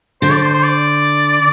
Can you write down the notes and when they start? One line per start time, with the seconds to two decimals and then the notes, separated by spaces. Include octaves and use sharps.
0.22 D3 C5
0.32 D5
0.43 C5
0.53 C5
0.63 D5